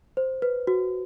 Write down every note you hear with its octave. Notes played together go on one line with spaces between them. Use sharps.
C5
B4
F#4